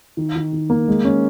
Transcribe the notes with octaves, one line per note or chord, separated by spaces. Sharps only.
D#3
D#3
D#3
A#3
G#3
C#4